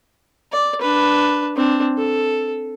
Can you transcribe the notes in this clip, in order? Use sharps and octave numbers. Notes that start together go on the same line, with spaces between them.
D5
D4 B4
C4 D4
A4